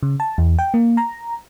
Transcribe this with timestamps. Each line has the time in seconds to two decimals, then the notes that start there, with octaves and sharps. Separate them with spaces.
0.03 C#3
0.20 A5
0.38 E2
0.59 G5
0.74 A#3
0.97 A#5